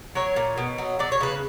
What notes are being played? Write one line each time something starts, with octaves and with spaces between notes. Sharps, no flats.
F#3 A#4 C#5
A#2
B2
F#3
F#3 D5
C#5
C#3 B4